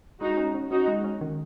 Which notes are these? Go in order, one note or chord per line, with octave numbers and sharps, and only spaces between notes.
G#3 D#4 F#4
C#4
C#4
C#4 D#4 F#4
G#3
C#4
D#3